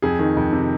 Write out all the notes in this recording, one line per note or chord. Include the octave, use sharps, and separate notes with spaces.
F2 G#4
D#3
F2
C3